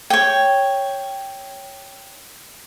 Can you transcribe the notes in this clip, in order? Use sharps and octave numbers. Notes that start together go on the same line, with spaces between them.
C#5 G5